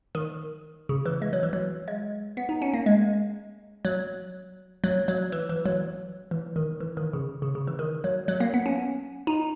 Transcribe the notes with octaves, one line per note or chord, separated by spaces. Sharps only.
D#3
C#3
E3
G#3
F#3
E3
F#3
G#3
B3
D#4
C#4
A#3
G#3
F#3
F#3
F#3
E3
E3
F#3
E3
D#3
E3
D#3
C#3
C#3
C#3
E3
D#3
F#3
F#3
A#3
B3
C#4
D#4